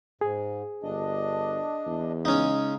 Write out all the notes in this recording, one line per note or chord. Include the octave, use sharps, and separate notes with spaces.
G#2 G#4
G1 D4 D#5
E2
C#3 G#3 C#4 D#4